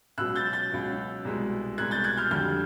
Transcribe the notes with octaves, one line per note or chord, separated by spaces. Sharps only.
C#2 B2 F#3 E6 F#6
G6 A6
G6 A6
C#2 B2 F#3
C2 B2 G#3
C2 B2 G#3 F#6 G#6
G6 A6
F#6 G#6
F6 G6
F2 D3 G3 F6 G6